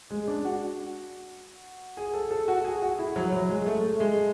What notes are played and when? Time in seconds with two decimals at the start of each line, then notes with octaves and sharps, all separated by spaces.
0.10 G#3
0.28 D4
0.45 F#4
1.97 G#4
2.14 A4
2.31 A4
2.48 F#4
2.64 G#4
2.82 F#4
2.99 E4
3.16 F#3
3.32 F#3
3.49 G#3
3.66 A3
3.83 A3
4.00 G#3